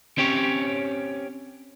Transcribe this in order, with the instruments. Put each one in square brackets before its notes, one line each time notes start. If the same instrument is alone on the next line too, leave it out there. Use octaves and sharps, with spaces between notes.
[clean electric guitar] C4 C#4 G4 C#5